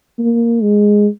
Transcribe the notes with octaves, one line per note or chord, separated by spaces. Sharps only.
A#3
G#3